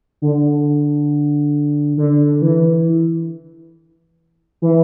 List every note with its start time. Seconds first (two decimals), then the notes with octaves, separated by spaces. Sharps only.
0.22 D3
1.97 D3
2.42 E3
4.62 E3